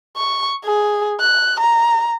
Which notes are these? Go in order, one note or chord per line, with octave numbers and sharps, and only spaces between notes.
C#6
G#4
F#6
A#5